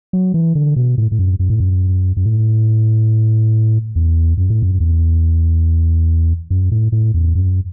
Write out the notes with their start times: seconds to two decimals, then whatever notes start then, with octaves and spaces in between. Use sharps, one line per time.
0.13 F#3
0.34 E3
0.55 D3
0.76 B2
0.98 A2
1.12 A2
1.19 F#2
1.40 F#2
1.50 A2
1.60 F#2
2.17 F#2
2.25 A2
3.96 E2
4.37 F#2
4.50 A2
4.62 F#2
4.80 E2
6.50 F#2
6.72 A2
6.92 A2
7.14 E2
7.35 F#2